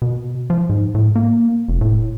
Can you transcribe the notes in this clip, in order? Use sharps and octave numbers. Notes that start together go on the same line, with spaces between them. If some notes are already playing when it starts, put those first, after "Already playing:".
B2
F3
G#2
A2
A#3
F1
A2